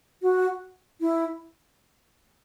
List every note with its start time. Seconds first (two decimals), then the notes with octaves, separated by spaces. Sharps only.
0.22 F#4
1.01 E4